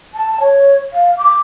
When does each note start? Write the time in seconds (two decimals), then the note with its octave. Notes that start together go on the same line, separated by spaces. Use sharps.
0.14 A5
0.40 C#5
0.93 F5
1.18 D6